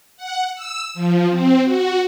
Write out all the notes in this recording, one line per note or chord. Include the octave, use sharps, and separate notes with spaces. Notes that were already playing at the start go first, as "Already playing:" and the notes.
F#5
E6
F3
C4
F#4